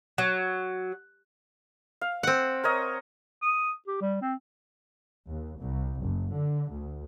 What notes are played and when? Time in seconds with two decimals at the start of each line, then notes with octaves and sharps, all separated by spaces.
0.18 F#3
2.01 F5
2.23 C4 F#5
2.64 A#4 C#5 D#5
3.42 D#6
3.87 G4
4.01 G3
4.22 C4
5.28 D#2
5.59 C2
6.01 F#1
6.33 D3
6.70 D2